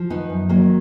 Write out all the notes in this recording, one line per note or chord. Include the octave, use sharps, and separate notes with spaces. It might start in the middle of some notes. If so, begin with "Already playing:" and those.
Already playing: F3
D#3 B3 D#4
F#2
D#3 F#3 A#3